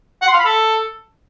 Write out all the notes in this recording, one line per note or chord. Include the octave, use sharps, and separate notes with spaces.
F#5
C6
F5
B5
A4